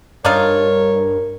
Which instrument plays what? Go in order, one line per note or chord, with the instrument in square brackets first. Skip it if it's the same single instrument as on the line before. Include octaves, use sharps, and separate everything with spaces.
[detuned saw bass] G2 [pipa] D4 D#4 F4 [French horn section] A#4 [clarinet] C#5